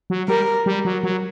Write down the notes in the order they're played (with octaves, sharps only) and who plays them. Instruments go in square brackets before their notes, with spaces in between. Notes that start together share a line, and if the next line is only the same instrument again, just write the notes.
[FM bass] F#3
[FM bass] G3 [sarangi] A#4
[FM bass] G3
F#3
F#3